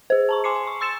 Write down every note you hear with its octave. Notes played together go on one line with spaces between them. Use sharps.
G#4 C5
A5 A#5 C#6
G#5 C6 D6 C7 C#7
G#5
C#6
C6 E6 A6 C#7 E7